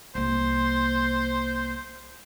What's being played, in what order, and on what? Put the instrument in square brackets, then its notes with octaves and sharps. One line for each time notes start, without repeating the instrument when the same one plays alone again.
[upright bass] C2 A#3 [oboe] C5